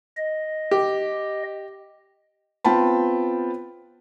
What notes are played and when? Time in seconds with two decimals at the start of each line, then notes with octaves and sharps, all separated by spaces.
0.17 D#5
0.71 G4
2.65 B3 C4 F4 G5 A5 B5